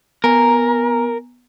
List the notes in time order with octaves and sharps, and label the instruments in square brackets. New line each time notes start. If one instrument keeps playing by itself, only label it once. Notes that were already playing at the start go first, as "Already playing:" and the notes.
[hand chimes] B3 G#5 A#5 [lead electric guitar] A#4